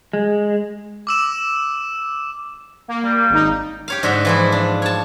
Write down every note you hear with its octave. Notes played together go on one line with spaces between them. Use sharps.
G#3
D6 E6 E7
A#3
G3
G#1 D#4
G4 C#5 F5
G#2 D3 F#4 E5
E3 F3 E4
D4
C#5 A5